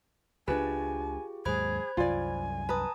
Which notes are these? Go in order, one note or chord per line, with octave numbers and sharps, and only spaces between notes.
C#2 G#3 D4 F4 G4 G#4 B4 G#5
D#2 G#2 F#3 G#4 C5 B5 G#6
C2 F#2 F4 D5 G#5
B4 A5 A#5 D#6